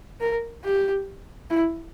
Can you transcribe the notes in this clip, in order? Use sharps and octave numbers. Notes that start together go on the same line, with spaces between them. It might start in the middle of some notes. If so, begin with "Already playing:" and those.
A#4
G4
E4